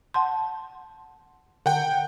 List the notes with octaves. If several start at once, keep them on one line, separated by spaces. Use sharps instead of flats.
F#5 A5 C6
D3 F#5 G5